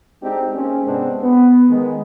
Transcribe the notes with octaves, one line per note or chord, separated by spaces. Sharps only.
G#3 C4 D4 D#4 F#4 G4
G#3 A#3 C4 C#4
G#2 C3 G#3 B3 C4 D4
B3
D#3 G#3